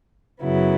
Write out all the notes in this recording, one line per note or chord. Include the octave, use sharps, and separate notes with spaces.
F#2 C#3 F#3 B3 E4